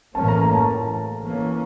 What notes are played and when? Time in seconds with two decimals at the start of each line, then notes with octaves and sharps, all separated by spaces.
0.15 A2 E3 A#3 C#4 A5
0.28 A#5
0.41 A#5
0.55 A5
1.22 E3 A#3 C#4